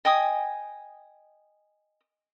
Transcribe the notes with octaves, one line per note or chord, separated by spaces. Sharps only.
D#5 G5 G#5 D#6